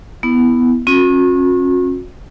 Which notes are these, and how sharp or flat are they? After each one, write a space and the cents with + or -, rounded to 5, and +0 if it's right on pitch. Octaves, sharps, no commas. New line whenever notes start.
B3 +5 E4 +0
C#4 -35 F#4 -45